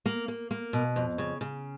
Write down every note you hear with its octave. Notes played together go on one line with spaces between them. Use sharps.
A#3
A#3
A#3
B2
F2
C#3
C#3